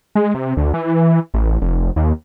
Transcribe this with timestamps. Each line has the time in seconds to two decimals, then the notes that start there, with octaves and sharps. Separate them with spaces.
0.15 G#3
0.35 C3
0.57 D2
0.74 E3
1.34 A1
1.62 F1
1.96 D#2